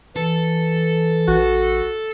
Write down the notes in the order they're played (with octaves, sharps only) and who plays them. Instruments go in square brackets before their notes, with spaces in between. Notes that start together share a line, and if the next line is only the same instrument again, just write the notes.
[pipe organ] E3 [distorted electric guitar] A4
[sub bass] A1 [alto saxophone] F#4